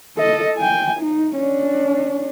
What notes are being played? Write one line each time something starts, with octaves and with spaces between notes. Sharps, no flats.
A4 D#5
G5 G#5
D#4
C#4 D4